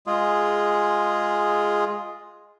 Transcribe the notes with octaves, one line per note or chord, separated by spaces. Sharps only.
G#3 F4 G#4